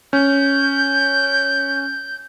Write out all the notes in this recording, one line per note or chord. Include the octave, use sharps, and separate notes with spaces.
C#4 G6